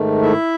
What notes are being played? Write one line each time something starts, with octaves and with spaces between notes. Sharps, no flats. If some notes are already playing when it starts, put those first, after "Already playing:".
Already playing: G#2 D#3 A3
E4 E5